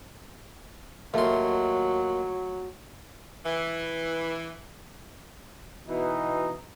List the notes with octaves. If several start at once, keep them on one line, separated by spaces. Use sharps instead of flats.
D#2 F#3 A3 F4 C6
E3
B2 E3 D#4